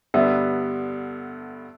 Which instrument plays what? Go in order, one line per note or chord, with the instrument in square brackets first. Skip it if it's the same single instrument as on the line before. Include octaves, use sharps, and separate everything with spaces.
[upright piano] G2 D3 G3 B3 [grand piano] E5